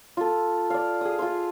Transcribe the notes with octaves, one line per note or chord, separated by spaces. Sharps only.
F4 A4
D5 F5
G#4 D#6
F4 E5 C6